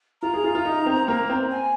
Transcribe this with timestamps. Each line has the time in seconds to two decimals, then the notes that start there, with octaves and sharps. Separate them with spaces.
0.22 F4 A#5
0.34 G#4
0.44 F4
0.55 F4
0.65 D#4
0.86 C4
1.08 A#3
1.29 C4
1.51 G#5